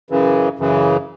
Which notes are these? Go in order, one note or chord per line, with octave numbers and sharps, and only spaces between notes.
F#2 C#3 E3
F#2 C#3 E3